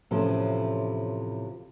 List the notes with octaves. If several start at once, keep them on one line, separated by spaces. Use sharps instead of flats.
A2 C3 E3 F3 A3 C#4